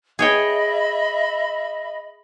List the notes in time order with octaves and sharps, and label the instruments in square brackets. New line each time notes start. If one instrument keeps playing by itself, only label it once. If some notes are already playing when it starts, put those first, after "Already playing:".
[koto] G#4 C#5 G5 [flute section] D#5 E5 B5